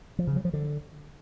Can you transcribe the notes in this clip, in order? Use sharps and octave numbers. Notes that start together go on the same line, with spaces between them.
F3
C#3
F#3
F3
D3